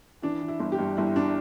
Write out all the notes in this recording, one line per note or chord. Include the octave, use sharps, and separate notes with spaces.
E3 D4
E3
E4
G1
G4
G2
G1 E4
D4